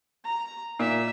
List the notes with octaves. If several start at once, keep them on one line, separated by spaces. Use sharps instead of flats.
A#5
A#2 E5